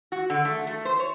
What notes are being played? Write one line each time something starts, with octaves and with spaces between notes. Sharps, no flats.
F#4
D3
A3
A3
C5
C#5